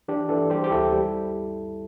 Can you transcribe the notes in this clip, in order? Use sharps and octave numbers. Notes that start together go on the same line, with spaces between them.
E3 D4 G4
E3 A4 D5
G3 G4 C5
G4
D2 E4 A4
G3